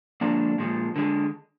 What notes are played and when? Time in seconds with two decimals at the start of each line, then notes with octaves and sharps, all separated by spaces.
0.21 D3 F3 G#3 A#3 D4
0.58 A#2 F3 G#3
0.96 D3 G#3